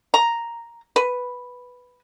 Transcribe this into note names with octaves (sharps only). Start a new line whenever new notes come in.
A#5
B4